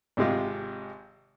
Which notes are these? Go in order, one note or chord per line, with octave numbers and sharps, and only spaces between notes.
G#1 C3 G#3 F4